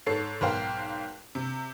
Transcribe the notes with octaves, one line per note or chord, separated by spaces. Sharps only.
G#2 A4 C#5 C7
B1 G#2 A#4 C5 F5 G5
C3